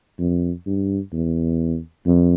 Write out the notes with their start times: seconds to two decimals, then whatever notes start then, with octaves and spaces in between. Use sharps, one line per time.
0.19 F2
0.66 G2
1.13 E2
2.06 F2